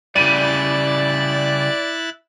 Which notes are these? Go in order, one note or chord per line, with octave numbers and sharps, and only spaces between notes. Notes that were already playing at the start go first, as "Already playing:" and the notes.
C#3 G3 E4 D5 F#6 A6 D#7